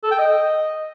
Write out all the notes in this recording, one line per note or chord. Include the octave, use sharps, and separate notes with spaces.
A4
G5
D#5